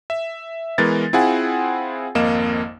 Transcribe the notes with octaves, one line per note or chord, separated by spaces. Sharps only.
E5
E3 G#3 B3 A#4 A6
C4 E4 F4 G#4 F#5 G#5
G#1 F2 A#3 D#5 F5 E7